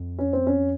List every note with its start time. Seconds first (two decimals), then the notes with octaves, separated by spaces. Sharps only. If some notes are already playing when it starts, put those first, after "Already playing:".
Already playing: F2
0.19 C#4
0.33 C4
0.47 C#4